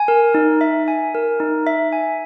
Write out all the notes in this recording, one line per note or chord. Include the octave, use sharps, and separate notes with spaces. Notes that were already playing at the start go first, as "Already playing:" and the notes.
Already playing: G#5
A#4
D#4
E5
G#5
A#4
D#4
E5
G#5